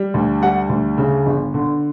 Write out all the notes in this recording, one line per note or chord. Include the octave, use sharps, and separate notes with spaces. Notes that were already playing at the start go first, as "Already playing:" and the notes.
Already playing: G3
D2
G3 F#5
D2
C#3
G1
D3